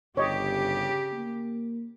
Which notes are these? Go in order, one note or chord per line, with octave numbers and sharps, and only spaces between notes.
G1 C#3 G4 C#5 D#5
A#3